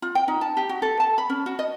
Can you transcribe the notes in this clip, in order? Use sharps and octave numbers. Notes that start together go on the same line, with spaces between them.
F4
G5
D#4
A5
G4
F#4
A4
A5
B5
C#4
F#4
D#5